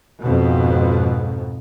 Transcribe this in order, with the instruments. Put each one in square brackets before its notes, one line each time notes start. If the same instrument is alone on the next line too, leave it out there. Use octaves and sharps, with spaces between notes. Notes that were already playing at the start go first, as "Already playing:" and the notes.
[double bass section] F2 G#2 B2